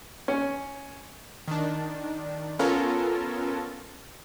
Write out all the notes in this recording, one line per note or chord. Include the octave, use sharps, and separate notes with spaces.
C#4
D#3 D4
B3 C#4 F4 A4 A#4